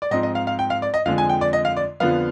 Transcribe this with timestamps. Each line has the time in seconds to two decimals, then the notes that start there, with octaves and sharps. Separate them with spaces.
0.02 D5
0.11 G#2 F3 C4 D#5
0.23 D#5
0.35 F5
0.47 F5
0.59 G5
0.70 F5
0.82 D5
0.94 D#5
1.05 F2 D3 F3 G#3 F5
1.18 G#5
1.29 G5
1.41 D5
1.53 D#5
1.65 F5
1.77 D5
2.00 F2 D3 F3 B3 F5